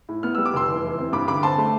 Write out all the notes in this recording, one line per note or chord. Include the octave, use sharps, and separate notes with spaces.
A2
B3 F6
G3 E6
D6
F1 C6 E6
E2
E3
C3
G2 B5 D6
D3 B5 D6
C4 A5 C6
A3